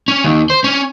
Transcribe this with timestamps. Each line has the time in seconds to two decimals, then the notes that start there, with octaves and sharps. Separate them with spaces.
0.08 C#4
0.24 D#2
0.50 C5
0.64 C#4